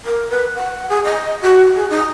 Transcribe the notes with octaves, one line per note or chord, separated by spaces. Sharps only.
A#4
B4
F#5
G#4
D#5
F#4
G#4
D#4